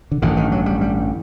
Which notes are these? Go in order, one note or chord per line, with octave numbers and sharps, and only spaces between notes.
D3
A1 G2 D3 D#3
D#3
F#3
G3
G3